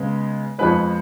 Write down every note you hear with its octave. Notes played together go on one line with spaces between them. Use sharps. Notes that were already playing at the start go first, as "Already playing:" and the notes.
Already playing: C#3 G#3 B3
F2 F3 G#3 B3 B4